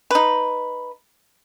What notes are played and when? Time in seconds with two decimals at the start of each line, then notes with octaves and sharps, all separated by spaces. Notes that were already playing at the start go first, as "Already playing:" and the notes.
0.11 D#4 B4